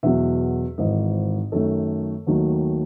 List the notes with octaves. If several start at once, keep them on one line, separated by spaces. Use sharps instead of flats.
E1 E2 B2 F#3 E5
G#1 G#2 E3 D#5
F#2 D#3 A3 A4
D#2 D#3 F#3 A3